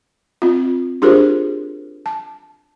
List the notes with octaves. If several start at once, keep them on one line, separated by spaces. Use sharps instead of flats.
C4 F4
D4 F4 G4 G#4 A#4 C5
A5